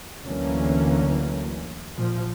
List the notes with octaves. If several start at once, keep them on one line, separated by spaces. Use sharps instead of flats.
D2 D3 E3 F#3 A#3 C#4
A#2 F3